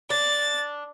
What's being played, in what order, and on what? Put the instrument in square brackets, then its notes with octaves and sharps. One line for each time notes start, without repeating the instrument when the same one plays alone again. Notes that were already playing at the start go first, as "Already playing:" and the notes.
[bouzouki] D4 [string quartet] A6